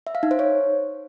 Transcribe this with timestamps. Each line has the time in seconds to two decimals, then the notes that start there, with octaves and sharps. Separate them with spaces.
0.07 E5
0.15 F5
0.23 D#4
0.31 C5
0.39 C#5